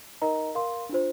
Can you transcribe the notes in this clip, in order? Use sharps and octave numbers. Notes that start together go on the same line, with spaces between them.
D#4 A#4 D#5 A#5
A#4 F5 C6
D4 F4 C5